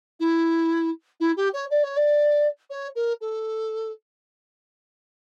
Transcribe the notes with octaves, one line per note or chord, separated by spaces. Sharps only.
E4
E4
G4
C#5
D5
C#5
D5
C#5
A#4
A4